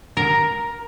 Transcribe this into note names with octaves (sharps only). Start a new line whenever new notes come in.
A#4